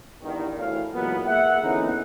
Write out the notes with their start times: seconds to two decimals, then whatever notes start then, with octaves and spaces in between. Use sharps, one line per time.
0.23 E2 G2 D#3
0.59 D2 A2 E3 F5
0.93 A#2 E3 F#3 G#3 B3
1.27 A#3 G#4 E5 F#5
1.63 D3 E3 B3 C#4 D#4